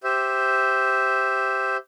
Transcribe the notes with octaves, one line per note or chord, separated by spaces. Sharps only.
G4 C5 E5